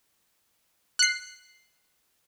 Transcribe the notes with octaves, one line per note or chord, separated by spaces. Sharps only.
F#6 C7